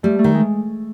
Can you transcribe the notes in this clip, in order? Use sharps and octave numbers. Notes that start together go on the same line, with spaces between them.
G3 A3
A3
D#3
G#3